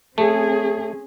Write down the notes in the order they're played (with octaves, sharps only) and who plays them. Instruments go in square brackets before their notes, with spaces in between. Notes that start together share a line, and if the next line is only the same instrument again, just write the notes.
[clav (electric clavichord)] A3 [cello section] C4 C#4 G#4